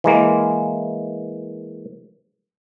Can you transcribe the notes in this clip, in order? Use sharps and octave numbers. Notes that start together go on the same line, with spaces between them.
E3 G#3 A#3